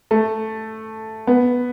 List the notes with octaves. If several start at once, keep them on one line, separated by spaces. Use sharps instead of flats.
A3
B3